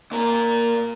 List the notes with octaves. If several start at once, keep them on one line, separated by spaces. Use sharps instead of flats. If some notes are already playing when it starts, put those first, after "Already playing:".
A#2 A#4